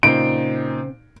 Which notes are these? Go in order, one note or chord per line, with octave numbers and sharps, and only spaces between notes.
A#2 C#3 C4 D#4 D7